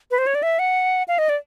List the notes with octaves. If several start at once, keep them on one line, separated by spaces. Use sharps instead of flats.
B4
C5
C#5
D5
E5
F#5
F5
D#5
D5